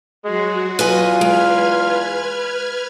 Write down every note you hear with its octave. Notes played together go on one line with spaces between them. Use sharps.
F#3 G#3 F#4
E2 F4 B4 D#5 G#5
G#3 B4 F6 G#6